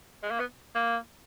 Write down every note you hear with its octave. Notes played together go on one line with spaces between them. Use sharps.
G#3
A#3
B3
A#3